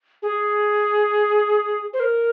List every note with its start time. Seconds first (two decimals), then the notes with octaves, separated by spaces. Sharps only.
0.22 G#4
1.93 C5
2.00 A#4